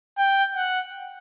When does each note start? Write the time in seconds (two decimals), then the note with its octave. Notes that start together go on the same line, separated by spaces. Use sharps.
0.18 G5
0.55 F#5